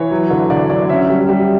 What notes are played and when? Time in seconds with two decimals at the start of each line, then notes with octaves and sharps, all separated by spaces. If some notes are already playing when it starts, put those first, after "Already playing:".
Already playing: E3 C#5
0.11 F#3
0.31 D3
0.50 D3 D5
0.69 F#3 D5
0.89 C#4 E5
1.09 G3
1.29 G3